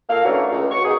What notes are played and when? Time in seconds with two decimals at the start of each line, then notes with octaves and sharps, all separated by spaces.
0.10 A#2 A#3 A4 F5
0.25 E3 A3 A#3 C#4 D4 F#4
0.52 C#2
0.71 F#4 C#6
0.85 B2 D#3 A#3 G#4